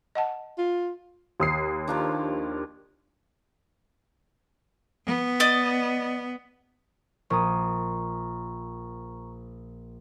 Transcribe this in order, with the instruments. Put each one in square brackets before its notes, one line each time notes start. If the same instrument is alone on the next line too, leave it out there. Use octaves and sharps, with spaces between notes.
[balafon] D#5 F#5 A5
[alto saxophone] F4
[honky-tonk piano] D#2 D#6 C7
[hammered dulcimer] D#3 F3 D4
[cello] B3
[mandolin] D5 D#5
[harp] A#1 D#6 [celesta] A#5 C#6